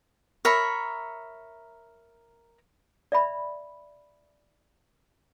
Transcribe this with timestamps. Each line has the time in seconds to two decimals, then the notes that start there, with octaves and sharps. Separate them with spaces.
0.45 A#4 C#5 E5 B5
3.12 D5 E5 B5